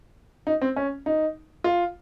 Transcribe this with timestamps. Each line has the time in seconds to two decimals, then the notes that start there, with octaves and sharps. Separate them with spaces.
0.47 D#4
0.61 C4
0.76 C#4
1.06 D#4
1.64 F4